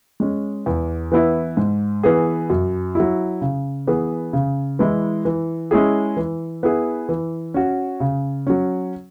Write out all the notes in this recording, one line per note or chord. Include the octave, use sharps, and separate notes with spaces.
G#3 C#4
E2
E3 B3 E4
G#2
E3 B3 G#4
F#2
F#3 E4
C#3
E3 B3 G#4
C#3
E3 G#3 E4
E3
G#3 C#4 E4 G#4
E3
B3 E4 G#4
E3
C#4 F#4
C#3
F#3 C#4